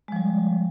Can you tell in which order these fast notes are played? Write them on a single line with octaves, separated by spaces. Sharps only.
G#3 F3 G3